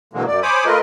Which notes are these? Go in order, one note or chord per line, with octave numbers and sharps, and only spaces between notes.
B2 D3 E3 F#3 G#3 A#3
F#2 D5
C5 C#5 G#5 B5 D6 D#6
A3 F4 A#4 B4 D#5